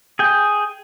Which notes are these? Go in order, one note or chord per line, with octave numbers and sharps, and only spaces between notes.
G#4 G5